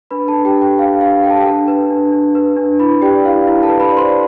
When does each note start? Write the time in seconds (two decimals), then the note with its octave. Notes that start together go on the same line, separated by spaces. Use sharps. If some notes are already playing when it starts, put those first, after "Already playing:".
0.11 D4 B4 B5
0.28 D4 A4 A5
0.45 G4 G5
0.56 A4
0.61 G4 G5
0.78 D4 F5
1.01 D4 F5
1.23 A4 G5
1.30 A5
1.37 G4 G5
1.45 D4 A4 A5
1.68 B4
1.90 D4
2.12 D4
2.35 B4
2.57 D4
2.79 E4 B4 B5
3.02 G4 D5 G5
3.25 E4 F5
3.47 E4
3.63 A4 A5
3.69 B4
3.80 B4 B5
3.91 D5
3.97 C5 C6